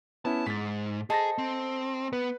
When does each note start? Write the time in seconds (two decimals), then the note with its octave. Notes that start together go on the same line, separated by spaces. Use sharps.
0.25 B3 C#4 E4 A5
0.47 G#2 A6 B6
1.10 G#4 A4 C5 D#5 A6 A#6
1.38 C4
2.13 B3 B4